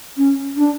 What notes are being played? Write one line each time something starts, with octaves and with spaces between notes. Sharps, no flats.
C#4
D4